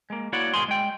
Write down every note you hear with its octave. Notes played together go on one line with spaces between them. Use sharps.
G#3 A#3
A#3 E4 F#4 C#5 D5 F#5
G#2 B2 D#3 G#4 C6
G#3 G5